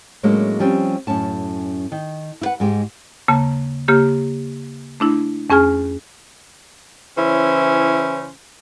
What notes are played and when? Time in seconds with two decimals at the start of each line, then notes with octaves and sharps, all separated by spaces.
0.23 A2 F#3 G#3 A#3 C#4 D4
0.59 F3 G3 C4 C#4
1.07 F#2 A2 C#4 A5
1.92 D#3
2.41 E4 B4 F#5
2.60 G#2 G#3 G4
3.28 D#2 C#3 A#3 A5
3.88 C#3 A#3 G4 F6
5.00 A3 D4 E4
5.50 F2 C#4 G#4 G#5 F6
7.17 C#3 E3 C#4 E4 C5